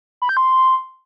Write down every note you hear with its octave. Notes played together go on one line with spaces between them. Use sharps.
B5
G6
C6